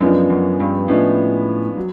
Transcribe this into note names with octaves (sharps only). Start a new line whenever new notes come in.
F#2 C#3 F3 G#3 B3 D4
F#2
G2
A2 C#3 F3 G#3 B3 D4
F#3